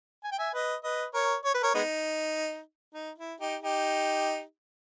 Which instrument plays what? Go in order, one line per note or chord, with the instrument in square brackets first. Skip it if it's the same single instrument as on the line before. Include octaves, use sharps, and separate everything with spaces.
[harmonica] G#5
G5
E5 G#5
B4 D#5
B4 D#5
A#4 C#5
C#5
B4
A#4 C#5
G#3 B3 D#4
D#4
E4
D#4 G4
D#4 G4